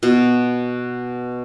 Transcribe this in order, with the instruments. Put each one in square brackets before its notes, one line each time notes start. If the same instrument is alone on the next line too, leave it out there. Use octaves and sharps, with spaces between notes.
[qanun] B2